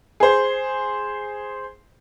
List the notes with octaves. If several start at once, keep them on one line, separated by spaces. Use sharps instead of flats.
G#4 C5